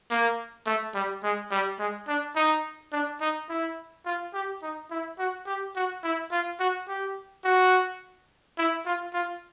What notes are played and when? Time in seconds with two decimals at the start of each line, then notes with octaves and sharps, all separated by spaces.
0.10 A#3
0.66 A3
0.94 G3
1.24 G#3
1.51 G3
1.79 G#3
2.08 D4
2.36 D#4
2.92 D4
3.21 D#4
3.49 E4
4.06 F4
4.34 G4
4.62 D#4
4.91 E4
5.19 F#4
5.47 G4
5.76 F#4
6.04 E4
6.32 F4
6.60 F#4
6.88 G4
7.44 F#4
8.58 E4
8.86 F4
9.14 F4